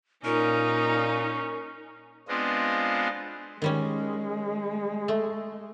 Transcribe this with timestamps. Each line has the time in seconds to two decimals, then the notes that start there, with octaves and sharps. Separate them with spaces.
0.25 A#2 C#4 D#4 A#4
2.28 G#3 B3 C4 D4 F4 D#5
3.62 D#3 G3 G#3 C#4
5.08 A3